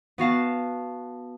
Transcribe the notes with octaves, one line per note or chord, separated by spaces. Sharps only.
B3 F#4 F5 A5